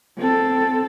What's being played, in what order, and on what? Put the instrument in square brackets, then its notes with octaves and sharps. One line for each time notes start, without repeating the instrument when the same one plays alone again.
[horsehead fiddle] C4 A4